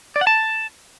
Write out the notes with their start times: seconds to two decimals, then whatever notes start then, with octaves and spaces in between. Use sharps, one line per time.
0.16 D5
0.21 F#5
0.27 A5